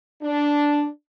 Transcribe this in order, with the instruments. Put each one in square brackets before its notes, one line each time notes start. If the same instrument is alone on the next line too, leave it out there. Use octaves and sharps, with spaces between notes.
[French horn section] D4